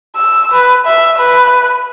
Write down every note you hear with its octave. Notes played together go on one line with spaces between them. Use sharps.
E6
B4
E5
B4